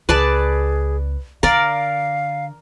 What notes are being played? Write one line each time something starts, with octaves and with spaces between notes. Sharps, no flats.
C#2 G#4 B4 D5 A5
D3 A#4 D5 F5